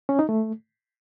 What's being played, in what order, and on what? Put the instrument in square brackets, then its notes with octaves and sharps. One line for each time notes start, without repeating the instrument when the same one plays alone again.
[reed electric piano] C#4
D#4
A3